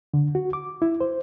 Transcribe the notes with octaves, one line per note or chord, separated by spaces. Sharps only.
D3
F#4
D6
E4
C5